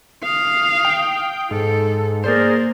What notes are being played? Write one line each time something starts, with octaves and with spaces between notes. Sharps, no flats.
F5 D#6
G5
G#2 A4
A#3 G#4 A#4 C5 D5